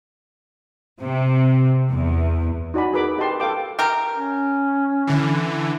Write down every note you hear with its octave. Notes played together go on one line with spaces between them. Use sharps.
C3
E2
D#4 F#4 D5 G#5 B5
G#4 A#4 B4 B5 D6
G4 D#5 G5 A5 C6
A4 F5 G5 D6
G4 A#4
C#4
D3 E3